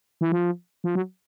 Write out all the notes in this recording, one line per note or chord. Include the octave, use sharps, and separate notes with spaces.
E3
F3
F3
F#3